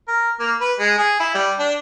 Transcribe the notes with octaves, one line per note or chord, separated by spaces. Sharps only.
A#4
A#3
B4
G#3
G#4
E4
G3
D4